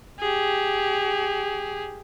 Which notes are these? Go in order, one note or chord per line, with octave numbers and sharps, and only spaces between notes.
G4 G#4